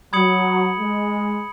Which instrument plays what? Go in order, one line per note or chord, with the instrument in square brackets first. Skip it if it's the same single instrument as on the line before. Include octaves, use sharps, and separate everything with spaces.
[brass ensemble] F#3 [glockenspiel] B5 D#6 G#6 C#7 F#7
[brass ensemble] G#3